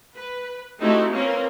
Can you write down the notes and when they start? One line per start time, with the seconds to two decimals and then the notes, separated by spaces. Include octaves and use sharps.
0.15 B4
0.80 A3 C4 D#4 E4 F#4 G4
1.12 A#3 C4 C#4 F4 A#4 B4